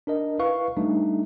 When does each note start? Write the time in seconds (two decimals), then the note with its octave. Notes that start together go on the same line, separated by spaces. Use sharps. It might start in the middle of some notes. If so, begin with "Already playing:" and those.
0.07 D4 A#4 D#5
0.39 E4 B4 F5 C#6
0.77 G3 A3 D4 D#4